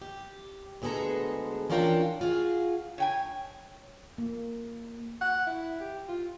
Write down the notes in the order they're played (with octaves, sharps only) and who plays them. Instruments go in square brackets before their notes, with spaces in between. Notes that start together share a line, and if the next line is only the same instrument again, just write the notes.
[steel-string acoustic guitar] G4
D2 G#3 B3 G#4 A4 A#5
E3 C#4 D4 F4 A#4 G5
F4 F#4 G#4
[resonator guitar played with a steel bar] C#5 G5 G#5
[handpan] A#3
[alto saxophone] F#5
E4
G4
F4